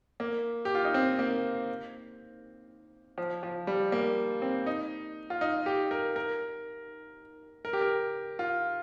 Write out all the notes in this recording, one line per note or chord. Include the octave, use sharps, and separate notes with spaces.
A#3
G4
F4
D#4
C4
A#3
F3
F3
G3
A#3
C4
D#4
F4
D#4
G4
A#4
A#4
A#4
G4
A#4
F4